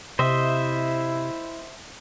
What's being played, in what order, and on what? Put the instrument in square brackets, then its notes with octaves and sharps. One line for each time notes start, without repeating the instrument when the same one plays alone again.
[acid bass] C3 [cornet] E4 [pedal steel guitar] C5 D#5 E5